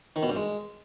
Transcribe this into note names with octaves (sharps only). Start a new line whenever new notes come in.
D#3
B2
G2
G#3